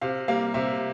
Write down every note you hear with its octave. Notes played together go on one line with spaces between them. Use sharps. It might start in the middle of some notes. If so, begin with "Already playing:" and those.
C3 F5
G3 A#3 F5
C3 E5